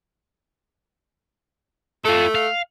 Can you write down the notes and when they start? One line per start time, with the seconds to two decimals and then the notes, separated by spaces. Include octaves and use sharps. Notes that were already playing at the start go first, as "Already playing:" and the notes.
2.05 A3 F4 A4
2.35 F5